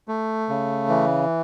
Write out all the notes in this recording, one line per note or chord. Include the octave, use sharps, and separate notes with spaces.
A3
C#3
E3